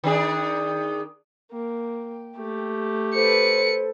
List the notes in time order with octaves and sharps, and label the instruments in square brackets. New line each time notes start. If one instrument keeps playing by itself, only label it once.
[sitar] D#3 D4 G#4
[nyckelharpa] A#3 [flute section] G5
[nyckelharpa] A3 G4
[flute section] A4 C5 [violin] B4 C#7